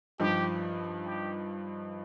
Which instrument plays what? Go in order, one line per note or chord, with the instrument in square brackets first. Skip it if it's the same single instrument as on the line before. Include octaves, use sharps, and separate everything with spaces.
[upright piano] G2 F3 D#4 [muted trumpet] G4
[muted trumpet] G4